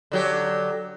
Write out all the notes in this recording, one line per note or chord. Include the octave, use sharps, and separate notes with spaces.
D3 F#3 G4